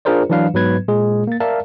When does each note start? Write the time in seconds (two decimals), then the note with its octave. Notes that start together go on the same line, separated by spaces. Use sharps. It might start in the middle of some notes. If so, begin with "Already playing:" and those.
0.05 D4 F4 G#4 A#4 C5 D5
0.30 E3 F#3 D4 B4 F5
0.54 G#2 F#3 B3 B4 G#6
0.88 A#2 G#3 G#4
1.27 A#3 A6
1.40 A#4 D5 E5 F5 A5